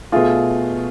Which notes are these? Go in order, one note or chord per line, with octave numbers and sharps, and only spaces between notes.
B2 A3 F4 G#4